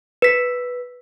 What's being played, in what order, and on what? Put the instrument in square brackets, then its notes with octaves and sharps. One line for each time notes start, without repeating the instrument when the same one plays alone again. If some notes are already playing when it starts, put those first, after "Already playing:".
[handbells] B4 B6